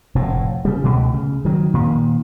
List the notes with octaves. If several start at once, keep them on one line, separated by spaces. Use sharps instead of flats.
F1 A2
C#3 G3
C#2 B2 A3
C#3
D#3 F#3
A#2 D#3